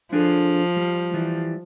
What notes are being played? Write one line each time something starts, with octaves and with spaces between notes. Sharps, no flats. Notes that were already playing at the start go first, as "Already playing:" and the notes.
F3 D4 G#4 A4
G3
E3 G3